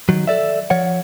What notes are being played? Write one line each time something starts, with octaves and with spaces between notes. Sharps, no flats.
D#3 F#3
A4 D5 E5
F3 C#5 F#5